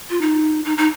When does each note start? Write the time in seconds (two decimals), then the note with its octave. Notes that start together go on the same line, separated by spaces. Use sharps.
0.10 F4
0.21 D#4
0.65 D#4
0.78 D#4